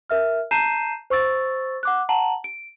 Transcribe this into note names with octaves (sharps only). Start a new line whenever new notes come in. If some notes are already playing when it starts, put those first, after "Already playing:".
A#4 E5 F6
A5 A#5 G6 C7 D#7 E7
C5 C#6 E6 A6
F#5 D6 F#6
F#5 A5 A#5 F#7
D7